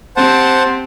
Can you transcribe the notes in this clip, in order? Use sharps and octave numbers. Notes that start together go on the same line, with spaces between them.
C4 G4 C5 F#5 A5